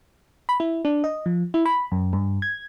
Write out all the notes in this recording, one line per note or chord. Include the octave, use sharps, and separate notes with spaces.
B5
E4
D4
D#5
F3
E4
B5
F#2
G2
G#6